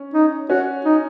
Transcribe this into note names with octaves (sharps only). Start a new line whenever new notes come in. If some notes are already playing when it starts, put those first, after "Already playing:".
Already playing: C#4
D#4
C#4 F#4
D#4